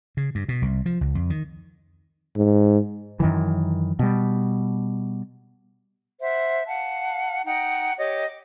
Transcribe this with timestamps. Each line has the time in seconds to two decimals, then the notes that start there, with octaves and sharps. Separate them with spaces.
0.17 C#3
0.35 G2
0.49 B2
0.62 C2
0.86 F3
1.01 C#2
1.15 F2
1.30 D#3
2.37 G#2
3.20 F#2 D#3 E3
3.99 B2 G3
6.20 C5 E5 F#5
6.66 F5 F#5 A5
7.44 D#4 F#5 G5 A#5
7.98 G4 C#5 D#5 D6
8.26 D6